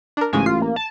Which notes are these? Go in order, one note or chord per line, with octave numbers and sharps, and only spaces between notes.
D4 A#4
A1 G#2 C#3 G#3 G#5
F4 C7
A#3
A5